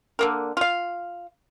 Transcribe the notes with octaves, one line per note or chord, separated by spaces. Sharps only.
D3 A#3 A#4
F4 F5